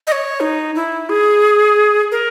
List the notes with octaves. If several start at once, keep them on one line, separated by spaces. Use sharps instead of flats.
D#5
C#5
D#4
E4
G#4
A#4